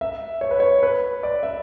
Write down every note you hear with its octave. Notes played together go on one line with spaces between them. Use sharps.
E5
C#5
B4
C#5
B4
D5
E5